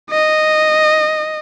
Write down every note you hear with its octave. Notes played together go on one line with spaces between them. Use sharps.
D#5